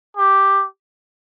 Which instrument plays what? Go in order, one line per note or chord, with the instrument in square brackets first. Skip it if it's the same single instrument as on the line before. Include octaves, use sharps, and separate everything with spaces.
[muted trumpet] G4